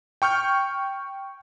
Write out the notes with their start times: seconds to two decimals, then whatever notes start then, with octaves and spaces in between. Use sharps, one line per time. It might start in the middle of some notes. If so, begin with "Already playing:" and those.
0.22 G5 C#6 F6 G6